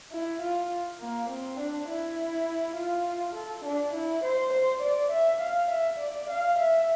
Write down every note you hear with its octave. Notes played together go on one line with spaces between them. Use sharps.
E4
F4
A#3
C4
D4
E4
F4
A4
D4
E4
C5
C5
D5
E5
F5
E5
D5
F5
E5